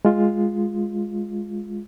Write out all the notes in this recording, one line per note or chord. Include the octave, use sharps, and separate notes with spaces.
G#3 F4